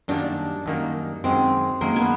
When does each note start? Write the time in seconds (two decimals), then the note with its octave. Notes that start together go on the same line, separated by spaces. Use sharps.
0.08 F#2 D#3 G3 A#3 D4
0.66 F#2 D#3 G3 A#3
1.24 F#2 D#3 G#3 C4
1.81 F#2 D#3 G#3 A#3
1.96 B3